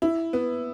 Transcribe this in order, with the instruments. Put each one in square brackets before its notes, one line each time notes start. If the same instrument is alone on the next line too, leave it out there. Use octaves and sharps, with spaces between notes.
[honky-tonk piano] E4
B3